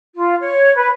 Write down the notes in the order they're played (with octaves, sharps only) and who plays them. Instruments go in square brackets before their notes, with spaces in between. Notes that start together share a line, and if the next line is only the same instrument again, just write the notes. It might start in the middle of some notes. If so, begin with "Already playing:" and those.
[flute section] F4
C#5
B4